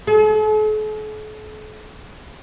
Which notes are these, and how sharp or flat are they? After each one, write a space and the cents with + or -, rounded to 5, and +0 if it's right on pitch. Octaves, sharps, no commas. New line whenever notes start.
A4 -45